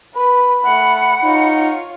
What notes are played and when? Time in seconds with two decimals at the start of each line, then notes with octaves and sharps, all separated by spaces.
0.15 B4 B5
0.64 A3 F#5 F#6
1.24 D#4 F4 C#5